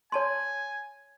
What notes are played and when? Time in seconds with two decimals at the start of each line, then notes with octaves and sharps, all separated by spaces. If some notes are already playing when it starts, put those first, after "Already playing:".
0.12 C#5 G#5 A5 C6